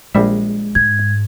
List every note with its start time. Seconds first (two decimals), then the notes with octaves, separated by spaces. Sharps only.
0.15 A#1 G3 G#3 E5
0.75 G#2 G#6